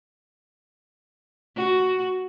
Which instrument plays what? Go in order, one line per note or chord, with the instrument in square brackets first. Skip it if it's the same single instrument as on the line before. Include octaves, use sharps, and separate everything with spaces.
[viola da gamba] F#4